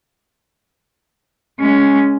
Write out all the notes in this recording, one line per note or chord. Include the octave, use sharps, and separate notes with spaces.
G#3 C#4